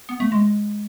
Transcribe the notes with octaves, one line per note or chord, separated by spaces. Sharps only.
B3
A3
G#3